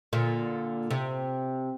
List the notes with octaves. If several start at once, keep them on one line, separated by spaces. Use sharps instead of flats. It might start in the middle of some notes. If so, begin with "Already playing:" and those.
A#2 D3
C3